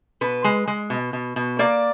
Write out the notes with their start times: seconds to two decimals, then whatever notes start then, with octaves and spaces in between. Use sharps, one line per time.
0.21 B2 B4
0.44 G#3
0.67 G#3
0.90 B2
1.13 B2
1.36 B2
1.59 A#3 D5